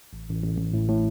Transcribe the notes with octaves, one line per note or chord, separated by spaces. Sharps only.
A1
A1
A1
A1
A2
A2